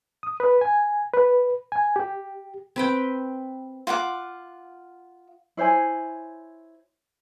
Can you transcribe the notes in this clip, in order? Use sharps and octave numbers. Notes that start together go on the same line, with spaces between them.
D#6
B4
G#5
B4
G#5
G4
C4 B4 G5
F4 F#5 G#5 D6
E4 C5 C#5 G#5